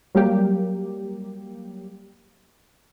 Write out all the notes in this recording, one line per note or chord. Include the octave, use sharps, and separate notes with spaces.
F#3 G3 A#3 G4